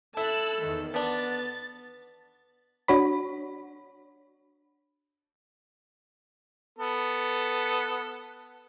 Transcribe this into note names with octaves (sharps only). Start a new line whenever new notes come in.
E4 A4 A5 E6 F#6
E2 D#3
D3 B3 D4 A6
D4 F#4 C#5 B5
B3 A4